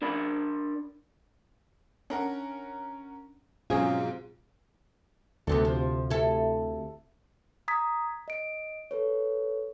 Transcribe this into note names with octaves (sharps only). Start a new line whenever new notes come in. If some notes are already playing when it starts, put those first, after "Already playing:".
D4 A#4 D5 B5
C#4 D4 A#4 F#5
G#2 B2 F#3 C4 C#4 F4 G#4 F5
D2 C3 B3 C4 A4
F3
E4 A4
A#5 D#6 G#6 B6
D#5 D7
A4 B4 C#5